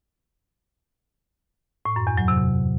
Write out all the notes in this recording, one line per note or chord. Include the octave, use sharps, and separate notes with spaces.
A2
F#2
E2
F#3
C3